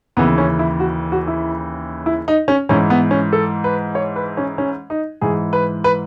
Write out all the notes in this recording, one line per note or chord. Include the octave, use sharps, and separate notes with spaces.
D#2 C#3 E3 B3
C#4
E4
F#4
F#4
E4
E4
D#4
C#4
G#2 E3 C#4
B3
C#4
A4
B4
C#5
B4
C#4
C#4
D#4
G#2 E3 G#4
B4
B4